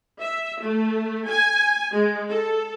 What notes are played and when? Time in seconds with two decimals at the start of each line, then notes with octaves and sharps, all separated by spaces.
0.21 E5
0.61 A3
1.28 G#5
1.93 G#3
2.29 A4